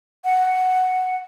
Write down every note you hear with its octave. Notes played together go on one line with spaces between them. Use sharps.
F#5